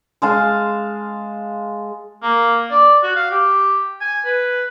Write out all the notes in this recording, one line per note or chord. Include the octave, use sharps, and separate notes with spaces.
G#3 F5 A5
A#3
D5
F#4
F5
G4
G#5
B4